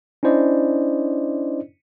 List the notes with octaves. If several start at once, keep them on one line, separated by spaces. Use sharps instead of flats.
C#4 D4 E4 C5 D5 D#5